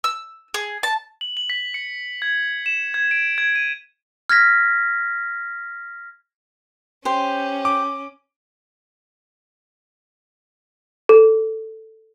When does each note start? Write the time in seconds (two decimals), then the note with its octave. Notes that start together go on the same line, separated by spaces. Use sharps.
0.04 E6
0.54 G#4
0.83 A5
1.21 F#7
1.37 F#7
1.50 B6
1.74 C#7
2.22 G#6
2.66 E7
2.94 G#6
3.11 D7
3.38 G#6
3.55 D#7
4.29 F6 G#6 A#6 B6
7.05 C#4 G4 C5
7.65 D6
11.09 A4